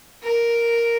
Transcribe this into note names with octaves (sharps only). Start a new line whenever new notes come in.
A#4